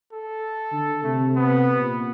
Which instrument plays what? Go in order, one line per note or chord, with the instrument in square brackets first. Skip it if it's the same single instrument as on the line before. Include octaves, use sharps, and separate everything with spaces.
[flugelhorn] A4
[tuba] D3
[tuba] C3 [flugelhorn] A3
[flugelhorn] B3
[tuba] A#2